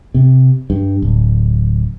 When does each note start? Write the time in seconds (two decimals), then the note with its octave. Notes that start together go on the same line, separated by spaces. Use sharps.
0.14 C3
0.70 G2
1.02 D1